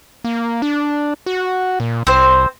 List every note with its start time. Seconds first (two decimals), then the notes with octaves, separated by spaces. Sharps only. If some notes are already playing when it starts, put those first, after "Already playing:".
0.24 A#3
0.62 D4
1.26 F#4
1.80 A#2
2.07 C2 C4 C5